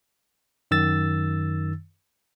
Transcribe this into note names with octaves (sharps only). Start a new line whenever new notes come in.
F#2 D#3 E6 A6